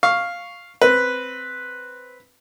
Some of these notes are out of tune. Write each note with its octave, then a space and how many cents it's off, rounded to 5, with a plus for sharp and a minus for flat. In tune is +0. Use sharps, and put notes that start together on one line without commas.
F5 +0 C#6 +0
C4 +0 B4 +0